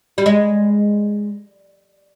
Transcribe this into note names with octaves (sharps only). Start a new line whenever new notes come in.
G3
G#3